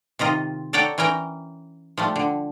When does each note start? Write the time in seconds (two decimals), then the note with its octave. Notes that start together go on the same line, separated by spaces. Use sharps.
0.19 C3 D#3 F4 D#5
0.73 A4 C#5 D5 F#5 G5 A#5
0.98 E3 C#4 A#4 G5 A#5
1.97 F3 G3 A3
2.16 D3